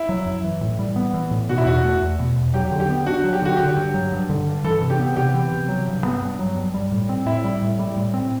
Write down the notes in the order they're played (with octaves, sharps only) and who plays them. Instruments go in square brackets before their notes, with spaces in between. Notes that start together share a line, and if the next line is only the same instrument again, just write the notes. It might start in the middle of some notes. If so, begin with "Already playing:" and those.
Already playing: [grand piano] E4
[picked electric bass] F#3
F#2
E3
A2
G3
B3
E3
A2
[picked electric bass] B2 [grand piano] F#4
[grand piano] E4
[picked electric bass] E2 [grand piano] F#4
[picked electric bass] A3
E2
B2
E2
[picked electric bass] F#3 [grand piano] G4
[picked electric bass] D3
[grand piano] G4
[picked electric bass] B3
[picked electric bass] D4 [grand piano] F#4
[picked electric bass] F#3
[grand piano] G4
[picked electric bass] D3 [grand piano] F#4
[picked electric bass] D3 [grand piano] G4
[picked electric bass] G2
F#3
G2
D3
G2
[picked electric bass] E3 [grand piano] A4
[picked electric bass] C3
[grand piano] G4
[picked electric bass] B3
[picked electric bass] C3 [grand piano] G4
[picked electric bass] E3
C3
F#3
G2
B3
G2
F#3
G2
G3
A2
C4
[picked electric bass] A2 [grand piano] E4
[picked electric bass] G3
A2
G3
A2
C4